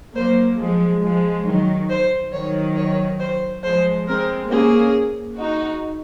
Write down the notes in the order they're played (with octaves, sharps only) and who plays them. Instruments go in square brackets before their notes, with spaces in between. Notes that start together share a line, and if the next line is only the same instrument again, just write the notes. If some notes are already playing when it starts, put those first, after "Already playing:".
[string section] F#3 A#3 [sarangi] C5
[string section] F3 G#3
F3 G#3
D#3 F#3
[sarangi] C5
[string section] D#3 F#3 [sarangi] C#5
[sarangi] C#5
C5
[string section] F3 G#3 [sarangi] C5
[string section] G#3 C4 [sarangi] A#4
[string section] A#3 C#4 [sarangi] G#4
[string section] D#4 F#4